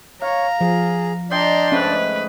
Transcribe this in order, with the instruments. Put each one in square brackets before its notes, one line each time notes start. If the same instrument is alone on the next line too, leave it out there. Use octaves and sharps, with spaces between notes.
[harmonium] C#5 [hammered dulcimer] F5 [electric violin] A#5
[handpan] F3 [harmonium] G#4
[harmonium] D4 D5 [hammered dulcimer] D#5 G5 [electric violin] A#5 C6
[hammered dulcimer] G#2 A3 [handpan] C#4 [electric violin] B4